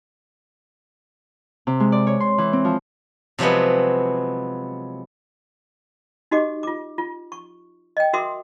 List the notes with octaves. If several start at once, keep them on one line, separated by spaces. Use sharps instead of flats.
C3
G#3
D5
C#5
C6
E3
C4
F3
C3 F3 F#3 G#3 B3
D#4 F#4 G4 D#5 D6
F4 D6
F4
C#6
D#5 G5
F#4 A#4 E5 C6 D6 D#6